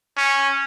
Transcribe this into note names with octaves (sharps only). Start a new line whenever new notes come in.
C#4